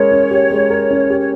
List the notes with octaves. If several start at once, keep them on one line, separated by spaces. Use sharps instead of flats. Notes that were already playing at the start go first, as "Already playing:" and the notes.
Already playing: G#3 C#4 A#4 C#5
C#4
G4
G#3
A#4
C#4
G4
C#5